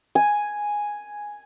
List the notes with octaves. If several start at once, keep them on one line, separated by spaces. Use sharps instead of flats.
G#5